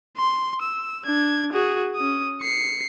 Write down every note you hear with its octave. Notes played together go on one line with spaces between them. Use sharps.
C6
E6
D4 G#6
F#4 G#4
C#4 D#6
C7 C#7